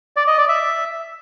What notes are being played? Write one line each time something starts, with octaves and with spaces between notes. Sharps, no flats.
D5
D#5
D5
E5